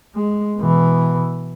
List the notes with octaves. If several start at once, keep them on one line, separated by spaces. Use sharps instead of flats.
G#3
B2 E3